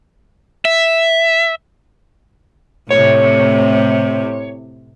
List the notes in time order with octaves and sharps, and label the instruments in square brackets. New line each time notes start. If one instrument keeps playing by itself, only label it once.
[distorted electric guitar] E5
[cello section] A2 C3 [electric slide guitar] C#5